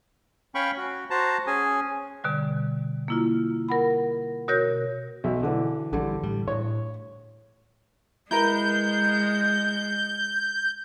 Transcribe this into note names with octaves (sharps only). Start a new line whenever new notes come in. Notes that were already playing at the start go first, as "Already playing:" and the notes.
C#4 F5 G5 B5 C#6
F#4
F#4 C5 A5 A#5
C#4 G#4 G#5
B2 D3 G3
A#3 E4 F4
A#4 F#5 B5
B2 F#4 A#4 C#5 G6 A#6
B1 F#4 E5
D3 E3
A#1 D3 E3 G3
A2 G3
A2 C#5
G#3 E4 A#4 B4 G6